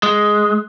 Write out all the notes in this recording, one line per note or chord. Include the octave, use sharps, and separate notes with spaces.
G#3